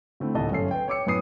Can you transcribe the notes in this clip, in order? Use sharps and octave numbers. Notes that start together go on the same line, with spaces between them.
D3 A3 C4 E4
D#1 D2 A2 A3 D#5 A5
G1 F#2 C#4 A4 C7
B4 G5
C#5 G5 D6 E6 C#7
F#2 A2 B3 D#6 C7